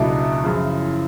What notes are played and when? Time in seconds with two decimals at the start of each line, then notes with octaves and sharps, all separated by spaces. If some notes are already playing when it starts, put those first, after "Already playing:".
Already playing: C#2 B2 F#3 A3 D4 E4
0.44 F#2 C#3 F3